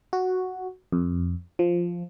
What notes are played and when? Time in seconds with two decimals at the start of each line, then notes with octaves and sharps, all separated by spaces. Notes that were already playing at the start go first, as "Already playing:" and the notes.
0.13 F#4
0.93 F2
1.59 F3